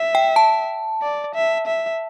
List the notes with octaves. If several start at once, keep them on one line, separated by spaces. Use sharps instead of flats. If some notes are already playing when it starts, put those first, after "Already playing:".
Already playing: E5
G5
A5
D5
E5
E5